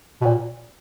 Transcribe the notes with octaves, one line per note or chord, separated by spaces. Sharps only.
B2
A#2